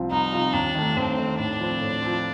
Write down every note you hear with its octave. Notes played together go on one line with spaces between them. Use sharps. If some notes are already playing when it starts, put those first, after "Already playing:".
Already playing: C2 C3 F3 C4 F4
C2 D#4
C3 F3 C4 F4
D#2 D4
D#3 A3
D#2 C4
D#3 A3
A2 D4
F3 C4
A2
F3 C4